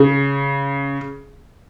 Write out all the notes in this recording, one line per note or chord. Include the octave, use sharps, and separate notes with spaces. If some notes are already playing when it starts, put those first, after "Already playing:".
Already playing: C#3